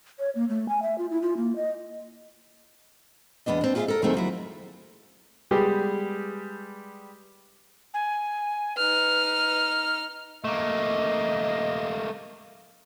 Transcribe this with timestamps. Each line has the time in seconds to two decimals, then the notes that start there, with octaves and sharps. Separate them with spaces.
0.19 C#5
0.35 A#3
0.49 A3
0.69 G#5
0.82 E5
0.98 F4
1.11 E4
1.22 F4
1.37 A#3
1.56 D#5
3.46 E2 C3 B3 D4 D#5
3.61 C4 D4
3.75 F4 F#4 G#4 A#4 E5 F5
3.88 A4 A#4
4.02 F2 D#3 F#3 A3 C4 G#4
4.14 D#2 F3 F#3 E4
5.51 G3 G#3 B3 G4 G#4
7.94 G#5
8.77 D#4 B4 F6
10.44 A3 A#3 D#5